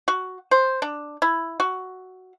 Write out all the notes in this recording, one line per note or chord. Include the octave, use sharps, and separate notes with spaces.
F#4
C5
D4
E4
F#4